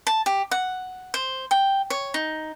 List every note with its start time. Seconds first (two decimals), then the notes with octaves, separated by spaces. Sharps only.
0.07 A5
0.26 G4
0.51 F#5
1.14 C5
1.51 G5
1.90 C#5
2.14 D#4